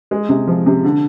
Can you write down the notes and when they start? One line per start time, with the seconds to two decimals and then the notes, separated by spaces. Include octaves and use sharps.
0.11 G#3
0.29 C3
0.47 F3
0.66 C3
0.84 D3